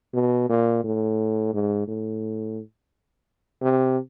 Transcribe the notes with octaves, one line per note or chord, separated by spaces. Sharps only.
B2
A#2
A2
G#2
A2
C3